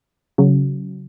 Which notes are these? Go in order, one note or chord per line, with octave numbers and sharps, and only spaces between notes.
C#3 F#3